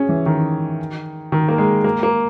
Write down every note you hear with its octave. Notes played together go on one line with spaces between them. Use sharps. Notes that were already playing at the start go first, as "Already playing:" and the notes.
Already playing: C#4 G#4
E3
D#3
D#3
A#3
G#3
A#3
A#3